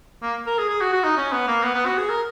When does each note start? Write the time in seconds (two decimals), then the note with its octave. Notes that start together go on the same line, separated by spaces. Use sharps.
0.22 A#3
0.47 A#4
0.58 G#4
0.69 G#4
0.81 F#4
0.92 F#4
1.04 D#4
1.17 C#4
1.32 B3
1.48 A#3
1.63 B3
1.74 B3
1.86 F#4
1.97 G#4
2.10 A#4